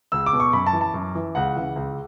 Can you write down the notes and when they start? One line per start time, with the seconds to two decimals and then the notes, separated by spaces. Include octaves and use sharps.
0.12 C#2 E6
0.26 D6
0.33 B2
0.40 C#6
0.53 F#2 B5
0.66 A5
0.73 E3
0.81 A5
0.94 F#2
1.15 E3
1.35 C#2 F#5
1.56 C#3 E3
1.76 C#2